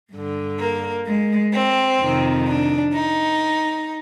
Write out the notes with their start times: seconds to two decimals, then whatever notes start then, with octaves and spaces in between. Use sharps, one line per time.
0.12 G2 D3
0.59 A#3
1.06 G#3
1.53 C4
1.99 F2 C3 D#3
2.47 D4
2.93 D#4